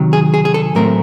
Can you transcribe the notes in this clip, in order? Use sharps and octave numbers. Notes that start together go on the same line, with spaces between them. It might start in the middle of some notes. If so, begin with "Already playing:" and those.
Already playing: C3 D#3 F#3
G#4
G#4
G#4
A4
A2 F#3 A3 C4 A#4